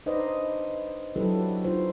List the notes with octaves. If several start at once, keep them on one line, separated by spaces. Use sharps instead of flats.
D4 D#4 B4 C5 D5 D#5
F#3 D4 E4 G4 A4 B4
D#4 F4 C5